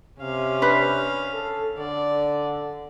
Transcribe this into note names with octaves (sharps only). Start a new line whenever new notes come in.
C3 C#4 F5
D4 B4 C5
A4
D3 D5